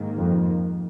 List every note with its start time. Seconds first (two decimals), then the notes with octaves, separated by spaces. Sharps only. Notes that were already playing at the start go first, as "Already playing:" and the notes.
Already playing: G#2 D#3 A#3
0.17 F2